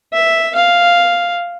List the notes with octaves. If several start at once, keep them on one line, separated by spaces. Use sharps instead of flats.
E5
F5